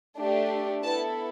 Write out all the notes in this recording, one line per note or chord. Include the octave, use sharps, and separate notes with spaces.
A3 D4 G4
B3 E4 A4 A5